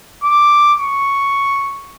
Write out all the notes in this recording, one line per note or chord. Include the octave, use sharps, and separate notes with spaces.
D6
C#6